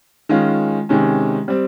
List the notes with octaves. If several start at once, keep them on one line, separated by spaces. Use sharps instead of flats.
D#3 G#3 C#4 F4
C3 D#3 G#3 C#4
G3 C4